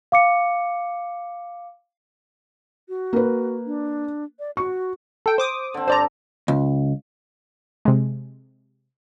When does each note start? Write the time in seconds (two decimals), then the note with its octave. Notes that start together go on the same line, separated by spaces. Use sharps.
0.12 F5 D6 C#7
2.89 F#4
3.13 A#3 B4
3.66 D4
4.39 D5
4.57 F#4 C#6
5.26 A4 G5
5.38 C5 D6 D#6
5.74 D3 C4
5.88 G2 C5 D5 A#5
6.48 C#2
7.85 C3 G#3